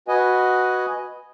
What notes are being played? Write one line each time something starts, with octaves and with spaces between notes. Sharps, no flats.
F#4 B4 D#5 F#5 G#5